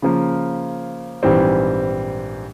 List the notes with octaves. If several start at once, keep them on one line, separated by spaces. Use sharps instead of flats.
C#3 F3 A#3
A#1 G#2 E3 G3 C4